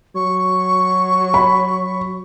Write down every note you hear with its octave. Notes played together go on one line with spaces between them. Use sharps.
F#3 C#6
B5